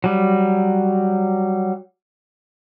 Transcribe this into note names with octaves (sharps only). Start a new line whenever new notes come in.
F#3 G3